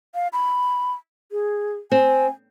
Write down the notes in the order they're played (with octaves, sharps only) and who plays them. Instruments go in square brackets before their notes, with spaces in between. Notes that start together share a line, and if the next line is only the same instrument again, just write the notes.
[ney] F5
B5
G#4
[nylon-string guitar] C4 [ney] G#5